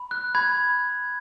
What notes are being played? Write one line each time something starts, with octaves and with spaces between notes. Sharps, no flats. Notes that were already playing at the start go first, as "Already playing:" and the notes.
Already playing: B5
F#6
B5 G#6